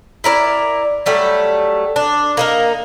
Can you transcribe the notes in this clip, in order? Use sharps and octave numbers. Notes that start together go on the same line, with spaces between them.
E4 A#4 C#5 D5
F#3 G3 A3
D4
A#3 D#4 A#4